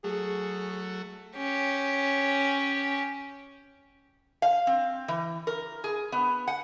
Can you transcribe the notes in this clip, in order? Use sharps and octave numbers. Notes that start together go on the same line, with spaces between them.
F#3 A3 G#4
C#4 G4
F5
C4
E3
A#4
G#4
B3
F#5